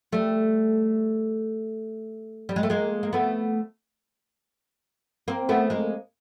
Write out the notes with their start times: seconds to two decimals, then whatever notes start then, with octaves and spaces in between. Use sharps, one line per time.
0.12 G3 A3
2.49 G3
2.56 G#3
2.63 A3
2.70 G#3 A#3
3.03 A#3
3.13 A3 B3
5.28 A#3 C4
5.49 A3 B3
5.70 G#3 A#3